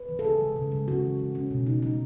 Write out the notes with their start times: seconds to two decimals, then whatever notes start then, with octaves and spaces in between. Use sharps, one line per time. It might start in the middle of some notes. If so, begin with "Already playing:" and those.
Already playing: B4
0.09 E3
0.19 A4
0.24 C#3 G#4
0.40 G#3
0.56 C#3
0.72 G#3
0.88 C#4 F#4
1.03 E3
1.19 G#3
1.35 C#4
1.51 B2
1.67 B2 D#4
1.82 G#3 D#4